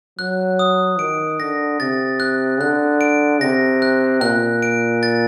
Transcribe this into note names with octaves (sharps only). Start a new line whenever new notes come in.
F#3 F#6
D#6
D#3 D7
D3 A#6
C3 A6
F#6
D3 F#6
D7
C3 A#6
F#6
A#2 F#6
D7
A6